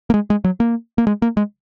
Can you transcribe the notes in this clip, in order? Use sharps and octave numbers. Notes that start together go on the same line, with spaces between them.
A#3
G#3
G#3
F#3
A#3
A#3
G#3
A#3
G#3